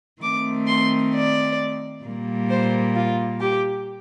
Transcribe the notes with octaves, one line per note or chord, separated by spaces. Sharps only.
D#3 A3 C4 D6
C6
D5
A#2 G3 A#3
C5
F4
G4